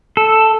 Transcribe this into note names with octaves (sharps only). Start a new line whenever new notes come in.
A4